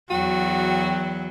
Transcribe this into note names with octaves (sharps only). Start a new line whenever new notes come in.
E2 F#3 F#4 G5